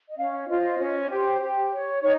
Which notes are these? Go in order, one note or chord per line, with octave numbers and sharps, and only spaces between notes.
D#5
C#4 F5
F4 C5 D#5
C#4
G4 C5
G4
C#5
D#4 C#5